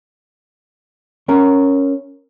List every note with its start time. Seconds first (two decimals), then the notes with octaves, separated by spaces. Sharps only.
1.29 C#4 A#4